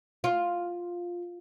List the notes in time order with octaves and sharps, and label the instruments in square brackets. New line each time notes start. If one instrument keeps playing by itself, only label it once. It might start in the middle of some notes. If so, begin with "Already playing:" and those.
[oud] F4